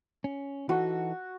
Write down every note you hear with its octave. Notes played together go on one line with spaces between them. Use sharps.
C#4
E3 D#4 F#4 A4